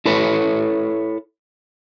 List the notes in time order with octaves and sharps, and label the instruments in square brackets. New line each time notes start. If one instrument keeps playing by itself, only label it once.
[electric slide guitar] E4 A4 B4 C#5